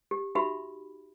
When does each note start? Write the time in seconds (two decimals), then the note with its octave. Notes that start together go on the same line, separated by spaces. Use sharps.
0.11 G4
0.35 D#4 F#4 G4 E5 B5